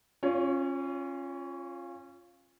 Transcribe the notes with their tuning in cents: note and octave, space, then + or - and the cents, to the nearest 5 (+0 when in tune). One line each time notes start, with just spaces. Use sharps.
C#4 -25 F4 +0 C#5 +25